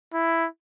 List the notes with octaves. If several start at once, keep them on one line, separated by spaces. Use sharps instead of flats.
E4